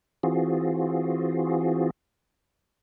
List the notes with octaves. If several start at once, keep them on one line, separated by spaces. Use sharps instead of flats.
E3 C4 F4 F#4 G#4